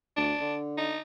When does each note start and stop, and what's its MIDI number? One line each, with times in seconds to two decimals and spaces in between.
0.16 0.33 38
0.16 0.55 62
0.40 0.96 50
0.78 1.00 63